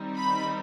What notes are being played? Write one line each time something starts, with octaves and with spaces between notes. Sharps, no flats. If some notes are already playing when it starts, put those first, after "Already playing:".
Already playing: D#3 G3 C4 D#4
B5